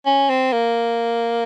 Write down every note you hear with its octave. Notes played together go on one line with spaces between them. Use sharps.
C#4
C4
A#3